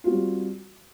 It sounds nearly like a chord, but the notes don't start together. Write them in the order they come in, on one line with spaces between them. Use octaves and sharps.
F4 F#4 C4 G3